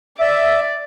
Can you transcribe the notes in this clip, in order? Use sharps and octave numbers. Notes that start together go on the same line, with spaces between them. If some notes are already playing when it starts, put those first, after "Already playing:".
D5 E5